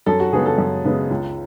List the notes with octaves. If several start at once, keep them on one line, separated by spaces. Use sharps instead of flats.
F#2 A4
F#4
C#3 G#3 B3 G#4
A4
F#2
C#3 G#3 B3
C#2